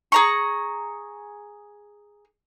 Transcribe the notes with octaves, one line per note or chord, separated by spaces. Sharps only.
G#4 A#5 C#6